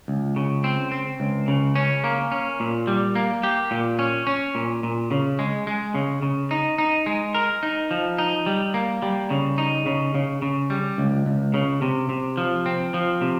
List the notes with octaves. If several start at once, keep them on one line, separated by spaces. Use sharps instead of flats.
C#2
C#3
C4
C4
C#2
C#3
C#4
A#3
C#4
A#2
G3
A#3
G4
A#2
C#4
C#4
A#2
A#2
C#3
G#3
G#3
C#3
C#3
D#4
D#4
G#3
A#4
D#4
F3
D#4
G3
A#3
G3
C#3
D#4
C#3
C#3
C#3
G3
C#2
C#2
C#3
C3
C3
F3
C4
F3
C3